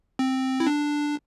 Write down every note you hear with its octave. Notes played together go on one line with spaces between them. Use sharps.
C4
E4
D4